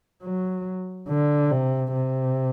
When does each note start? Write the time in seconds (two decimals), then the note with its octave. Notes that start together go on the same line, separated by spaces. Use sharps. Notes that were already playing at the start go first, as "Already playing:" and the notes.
0.23 F#3
1.09 D3
1.51 C3
1.93 C3